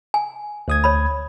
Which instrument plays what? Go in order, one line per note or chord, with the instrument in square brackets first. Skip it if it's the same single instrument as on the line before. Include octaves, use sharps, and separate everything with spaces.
[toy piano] G#5
[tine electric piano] D2 D#6 G#6
[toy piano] C#5 B5